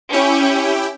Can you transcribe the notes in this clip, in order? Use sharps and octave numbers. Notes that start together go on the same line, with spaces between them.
C#4 E4 G4 G5